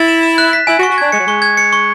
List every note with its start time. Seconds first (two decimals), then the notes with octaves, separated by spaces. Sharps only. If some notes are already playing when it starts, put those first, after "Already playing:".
Already playing: E4 A6
0.08 E7
0.23 E7
0.38 F#6
0.53 B6
0.67 E4 G#5
0.79 F#4
0.83 C#6
0.90 F#4
0.98 D4 G#6
1.12 G#3 C#7
1.20 F#3
1.27 G#3 C#6
1.42 G#6
1.57 C#7
1.73 C#6